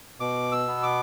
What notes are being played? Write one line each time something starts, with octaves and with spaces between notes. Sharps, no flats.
B2 D6
E6
B3
D6